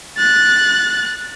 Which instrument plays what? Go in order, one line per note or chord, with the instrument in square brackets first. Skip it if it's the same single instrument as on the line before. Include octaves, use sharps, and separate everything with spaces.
[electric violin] F#6 A6